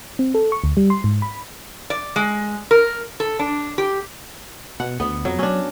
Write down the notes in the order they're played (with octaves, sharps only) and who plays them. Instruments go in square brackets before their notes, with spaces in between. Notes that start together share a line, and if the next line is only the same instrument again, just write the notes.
[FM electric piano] C4
A4
C#6
D2
G3
C6
G#2
B5
[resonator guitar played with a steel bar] D5
G#3
A#4
A4
D4
G4
[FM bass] B2 [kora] F#5
[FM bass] D2 [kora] B3
[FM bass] F2 [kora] F#3
[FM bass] F#3 [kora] C#4 D4